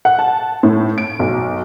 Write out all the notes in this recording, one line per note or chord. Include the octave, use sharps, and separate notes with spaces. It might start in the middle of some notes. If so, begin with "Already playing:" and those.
F#5
A5
A2
D7
B1